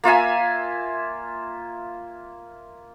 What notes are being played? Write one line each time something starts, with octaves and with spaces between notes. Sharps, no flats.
A#3 F4 E5 G#5